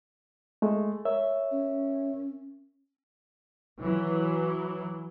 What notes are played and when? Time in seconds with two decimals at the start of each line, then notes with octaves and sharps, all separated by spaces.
0.62 G#3 A3
1.05 A#4 C#5 E5
1.51 C#4
3.79 E3 F#3